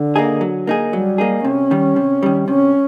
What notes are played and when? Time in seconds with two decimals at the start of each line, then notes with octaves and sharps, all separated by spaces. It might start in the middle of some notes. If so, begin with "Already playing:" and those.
Already playing: D3
0.16 A#3 D#4 G#4
0.41 F#3
0.67 A#3 D#4 G#4
0.93 F#3 G3
1.18 A#3 D#4 G#4
1.44 C3 C#4
1.71 D#3 G3
1.96 C3
2.23 D#3 G3
2.48 C3 C#4